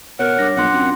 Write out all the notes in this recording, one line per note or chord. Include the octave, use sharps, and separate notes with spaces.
B2 A#4 C#5 F#5
G2 D6 A#6
B1 G3 D4 F4 F#5 C6
F#2 C4